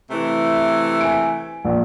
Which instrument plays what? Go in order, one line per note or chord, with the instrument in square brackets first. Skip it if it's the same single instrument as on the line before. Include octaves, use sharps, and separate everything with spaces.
[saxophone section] C3 E3 A3
[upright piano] G#5 D7
A#1